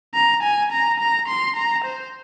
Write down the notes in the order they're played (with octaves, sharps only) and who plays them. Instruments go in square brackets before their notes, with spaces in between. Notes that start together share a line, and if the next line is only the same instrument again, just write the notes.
[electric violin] A#5
G#5
A#5
A#5
C6
A#5
C5